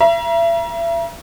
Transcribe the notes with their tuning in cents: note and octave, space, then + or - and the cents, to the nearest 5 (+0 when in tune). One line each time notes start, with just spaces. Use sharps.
E5 +35 A#5 +35